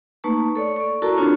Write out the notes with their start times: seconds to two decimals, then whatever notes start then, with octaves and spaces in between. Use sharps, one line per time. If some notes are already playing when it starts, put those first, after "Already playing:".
0.24 A3 A#3 D#4 B4 A5 C#6
0.56 A4 C#5 D5
0.76 D5 C#6
1.02 E4 F#4 A4 A#4 A5 A#5
1.17 C4 D4 F4 F#4 C#5